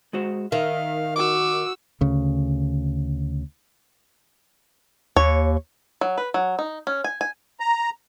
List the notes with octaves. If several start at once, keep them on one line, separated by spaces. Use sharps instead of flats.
G#3 F#4 C5
D#3 E5 F5
F#4 D6 E6
D2 C#3
D#2 C#5
F#3
B4
F#3
D#4
C#4
G#5
G#5
A#5